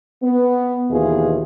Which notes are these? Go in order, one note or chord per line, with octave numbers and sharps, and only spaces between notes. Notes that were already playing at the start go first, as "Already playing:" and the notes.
B3
D#2 B2 E3 B3 F4 G#4